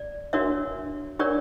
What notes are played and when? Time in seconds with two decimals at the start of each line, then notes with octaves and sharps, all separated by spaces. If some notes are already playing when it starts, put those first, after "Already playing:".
Already playing: D5
0.33 D4 F#4 A#4 C#5 E5
1.19 D4 G4 A#4 C#5 D5